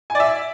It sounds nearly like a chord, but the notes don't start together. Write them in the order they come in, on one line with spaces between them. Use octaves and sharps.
G#5 D5 E5